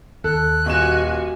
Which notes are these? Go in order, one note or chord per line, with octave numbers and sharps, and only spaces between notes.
D#2 A4 F#6
D#1 F#4 D#5 G#5 E7